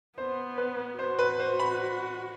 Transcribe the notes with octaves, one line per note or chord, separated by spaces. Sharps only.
B3 C5
B4
F#4 C5
B4
C5
B5